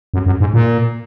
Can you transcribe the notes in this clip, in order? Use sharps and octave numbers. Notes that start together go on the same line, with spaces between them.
F#2
F#2
G#2
A#2